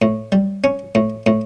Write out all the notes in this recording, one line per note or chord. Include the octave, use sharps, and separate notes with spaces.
A2
G3
C#4
A2
A2